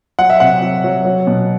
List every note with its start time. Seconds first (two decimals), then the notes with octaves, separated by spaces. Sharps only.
0.19 F#3 F#5
0.30 E5
0.40 C3 F#5
0.62 F#3
0.84 F#3
1.05 F#3
1.27 B2